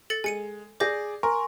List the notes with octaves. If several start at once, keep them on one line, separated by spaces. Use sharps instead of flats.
A4 A6 C#7
G#3 G#5 C#7 D#7
G#4 D5 D6 G6 A#6
A#4 G#5 C6 C#6